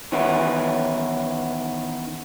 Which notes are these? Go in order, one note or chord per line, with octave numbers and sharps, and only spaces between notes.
D#3 E3 B3 C#4 E4